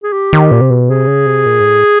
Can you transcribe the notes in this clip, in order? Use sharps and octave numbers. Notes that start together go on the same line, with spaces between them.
G#4
G4
D#3
A#2
C3
B2
C3 G#4
C#3
C3
A#2
G#2
A2